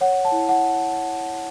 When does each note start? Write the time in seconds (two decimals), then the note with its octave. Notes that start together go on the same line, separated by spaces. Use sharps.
0.01 C#5 F#5
0.25 A5
0.32 E4
0.49 F#5